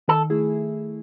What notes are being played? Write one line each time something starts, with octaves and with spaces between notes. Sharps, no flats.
D#3 A4
A3 E4 G#4